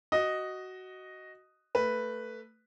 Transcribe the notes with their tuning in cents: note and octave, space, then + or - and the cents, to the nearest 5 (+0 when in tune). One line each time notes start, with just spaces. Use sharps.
F#4 +10 D#5 +0
A3 +20 B4 +0